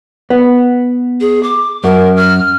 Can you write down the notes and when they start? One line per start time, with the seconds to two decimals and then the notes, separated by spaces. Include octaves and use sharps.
0.30 B3
1.21 G#4
1.43 D6
1.84 F#2 A#4
2.17 F6